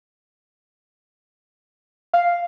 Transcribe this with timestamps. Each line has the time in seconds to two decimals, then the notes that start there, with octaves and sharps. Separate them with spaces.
2.14 F5